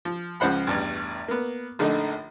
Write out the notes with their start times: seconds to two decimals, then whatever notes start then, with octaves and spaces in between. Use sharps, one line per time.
0.05 F3
0.40 C#2 C#3 F3 C5 F#5 B5
0.67 A1 E2 G2
1.28 A#3 B3
1.79 A#1 D3 A3 D#4